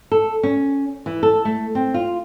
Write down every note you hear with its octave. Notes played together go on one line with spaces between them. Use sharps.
A4
C#4
E3
A4
A3
C4
F4